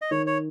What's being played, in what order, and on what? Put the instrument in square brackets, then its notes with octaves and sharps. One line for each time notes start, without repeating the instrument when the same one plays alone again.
[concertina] D#5
[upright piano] D#3 [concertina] C#5
[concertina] C#5